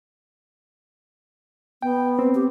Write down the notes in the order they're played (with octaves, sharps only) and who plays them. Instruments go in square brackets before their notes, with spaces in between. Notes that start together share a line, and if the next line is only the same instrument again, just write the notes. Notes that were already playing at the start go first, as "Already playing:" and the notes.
[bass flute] B3 [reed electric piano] G5
[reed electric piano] C4
[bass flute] G4